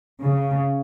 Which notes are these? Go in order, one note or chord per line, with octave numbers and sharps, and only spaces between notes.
C#3